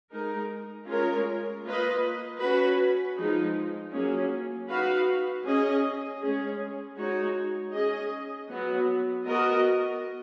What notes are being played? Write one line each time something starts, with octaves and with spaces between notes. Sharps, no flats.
G#3 D#4 A#4
G#3 C#4 F4 A#4 C#5
A#3 F4 B4 D#5
C#4 F#4 B4
F3 G#3 D#4
F#3 A#3 C#4 G#4
D#4 F#4 B4 F5
C#4 G#4 D#5
G#3 C#4 G#4
G#3 D#4 F#4 C#5
C#4 G#4 D#5
F#3 B3 F#4
B3 F#4 A#4 D#5